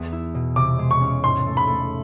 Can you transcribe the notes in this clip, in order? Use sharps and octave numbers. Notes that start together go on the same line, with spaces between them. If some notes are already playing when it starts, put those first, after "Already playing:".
Already playing: E2 B3
E4
B2
C3 D6
G#3
C#6
C#4
G#2 C6
A3
B5
A3